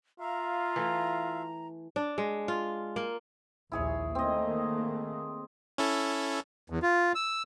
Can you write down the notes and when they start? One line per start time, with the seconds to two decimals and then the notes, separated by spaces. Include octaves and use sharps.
0.20 F4 E5 F5 A#5
0.76 E3 A3 E4
1.96 D4
2.18 G#3
2.48 F4
2.96 A#3
3.72 A#1 D#2 E4 G#4 C#5
4.15 D#3 A3 A#3 C4 D#5
5.78 C#4 E4 A4
6.70 E2
6.82 F4
7.15 E6